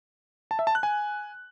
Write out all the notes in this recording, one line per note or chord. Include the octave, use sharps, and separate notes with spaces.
A5
E5
A5
F#6
G#5